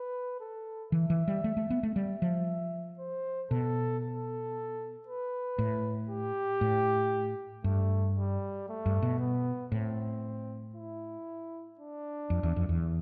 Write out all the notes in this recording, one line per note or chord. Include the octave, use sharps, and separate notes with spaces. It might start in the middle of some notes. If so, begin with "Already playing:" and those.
Already playing: B4
A4
E3 E5
E3
G3
A3
A3
B3
A3
G3 E5
F3
C5
B2 A4
A4
B4
A2
G4
A2
G2 A3
G3
A3
G2
B2
B3
A2 C4
E4
D4
F2
E2
F2
E2